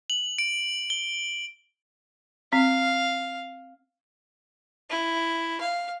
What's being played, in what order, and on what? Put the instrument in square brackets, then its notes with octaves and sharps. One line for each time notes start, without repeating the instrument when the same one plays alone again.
[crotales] F#7
D7
G7
[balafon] C4 [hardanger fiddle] F5
[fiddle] E4
F5